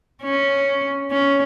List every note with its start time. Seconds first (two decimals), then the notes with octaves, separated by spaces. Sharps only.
0.23 C#4
1.12 C#4